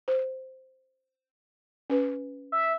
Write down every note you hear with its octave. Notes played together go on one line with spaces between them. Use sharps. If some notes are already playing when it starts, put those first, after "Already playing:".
C5
C#4 B4
E5